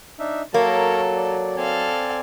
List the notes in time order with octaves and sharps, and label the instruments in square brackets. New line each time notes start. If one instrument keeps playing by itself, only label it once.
[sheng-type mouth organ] D4 D#4 E5
[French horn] F#3 [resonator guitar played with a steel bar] A#3 [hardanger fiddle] A4 [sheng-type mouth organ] A#4 C#5 A#5
[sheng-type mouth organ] D5
[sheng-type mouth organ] C4 D5 G#5 [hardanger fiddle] A4 F5